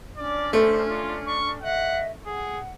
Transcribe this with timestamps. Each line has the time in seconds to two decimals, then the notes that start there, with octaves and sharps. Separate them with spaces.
0.17 C#4 D4 D5 F6
0.53 A3 C5
0.88 F4
1.26 C#6
1.62 D#5 E5 F#5
2.26 G#4 F#5